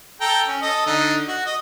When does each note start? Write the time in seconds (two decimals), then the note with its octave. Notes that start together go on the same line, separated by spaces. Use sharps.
0.21 A4 G5 A#5
0.47 C#4
0.62 A4 D#5
0.86 D3 D#4
1.28 F#4
1.46 D#5